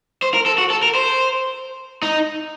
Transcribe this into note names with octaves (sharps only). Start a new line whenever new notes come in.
C5
A#4
A4
F#4
A4
A#4
C5
D#4